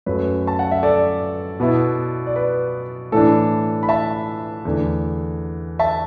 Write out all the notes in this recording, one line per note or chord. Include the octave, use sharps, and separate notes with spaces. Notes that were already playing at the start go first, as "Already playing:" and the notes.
F#2 F#3 A3 B4
A5
F#5
E5
A4 D5
B2 B3 E4
D5
B4
A2 E3 D4 A4
B5
E5 A5
E2 D3 A3 D4
E5 A5